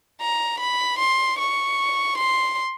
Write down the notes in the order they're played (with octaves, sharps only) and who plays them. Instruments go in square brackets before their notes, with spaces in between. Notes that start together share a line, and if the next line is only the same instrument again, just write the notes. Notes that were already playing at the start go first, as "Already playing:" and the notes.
[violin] A#5
B5
C6
C#6
C6